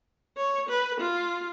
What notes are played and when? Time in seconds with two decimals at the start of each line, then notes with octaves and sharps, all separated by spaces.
0.37 C#5
0.69 B4
1.01 F4